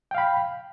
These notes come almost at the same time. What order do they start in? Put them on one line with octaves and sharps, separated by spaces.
G5 F5 B5